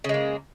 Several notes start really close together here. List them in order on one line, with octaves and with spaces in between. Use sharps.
C#3 G#3 A#3